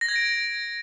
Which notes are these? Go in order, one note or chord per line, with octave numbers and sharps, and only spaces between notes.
A#6
G#6
D7